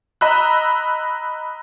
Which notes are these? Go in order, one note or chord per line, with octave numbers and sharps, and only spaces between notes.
D#5 A#5 B5 E6 F#6